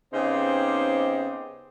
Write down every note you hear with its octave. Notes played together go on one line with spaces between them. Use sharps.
C#3 B3 C4 D#4 G4 C5